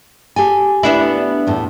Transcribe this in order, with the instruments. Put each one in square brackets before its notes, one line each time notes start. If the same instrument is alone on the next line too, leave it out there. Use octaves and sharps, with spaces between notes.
[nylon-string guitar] G4 A4 G#5
[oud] B3 D4 E4
[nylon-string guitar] E2 A2